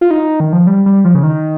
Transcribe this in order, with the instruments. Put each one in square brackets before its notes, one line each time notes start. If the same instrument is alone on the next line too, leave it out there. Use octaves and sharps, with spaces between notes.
[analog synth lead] F4
D#4
D#3
F3
G3
G3
F3
C#3
D#3